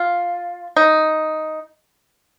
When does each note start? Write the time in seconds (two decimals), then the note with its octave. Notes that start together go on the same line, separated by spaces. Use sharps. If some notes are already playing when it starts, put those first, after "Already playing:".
Already playing: F4
0.76 D#4